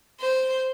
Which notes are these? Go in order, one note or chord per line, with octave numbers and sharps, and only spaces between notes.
C5